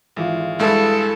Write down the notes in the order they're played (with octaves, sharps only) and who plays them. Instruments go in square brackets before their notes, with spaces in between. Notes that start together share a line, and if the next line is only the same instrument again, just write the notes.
[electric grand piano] G#1 [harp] E3 G#3 F4
[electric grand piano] G2 G#3 E4 [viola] A4 [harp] A5